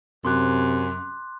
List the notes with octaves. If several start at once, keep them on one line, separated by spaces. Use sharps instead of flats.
F#2 C3 C6 D6 F#6